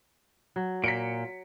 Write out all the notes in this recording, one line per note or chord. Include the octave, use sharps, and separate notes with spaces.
F#3
A#2 B6 C#7 D7